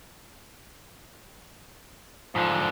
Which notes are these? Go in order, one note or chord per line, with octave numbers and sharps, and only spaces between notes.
G#2 D3 F3